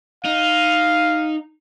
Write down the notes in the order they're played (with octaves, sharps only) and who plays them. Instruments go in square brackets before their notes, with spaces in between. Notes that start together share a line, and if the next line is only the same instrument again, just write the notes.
[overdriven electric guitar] D#4 [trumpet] F5